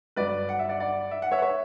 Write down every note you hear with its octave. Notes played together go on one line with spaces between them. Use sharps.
G1 G2 F#3 B4 D5
F#5
E5
D5 F#5
D5 F#5
E5
F#5
C#5 E5
F#5
C#5 E5